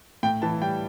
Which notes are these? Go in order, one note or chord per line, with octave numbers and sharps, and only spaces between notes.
A2 G5
E3 A5
G3 G5